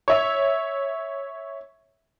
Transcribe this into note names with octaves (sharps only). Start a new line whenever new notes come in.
C#5 E5